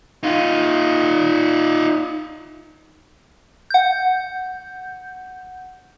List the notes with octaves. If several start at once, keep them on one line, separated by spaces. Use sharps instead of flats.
D#4 F4
F#5 G6